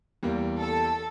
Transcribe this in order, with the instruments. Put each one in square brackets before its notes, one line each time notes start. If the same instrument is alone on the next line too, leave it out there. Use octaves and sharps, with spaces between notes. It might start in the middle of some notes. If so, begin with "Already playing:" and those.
[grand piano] E2 G3 A#3
[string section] A4